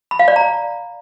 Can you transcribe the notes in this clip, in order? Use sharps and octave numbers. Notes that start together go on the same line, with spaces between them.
B5
F5
D5
A#5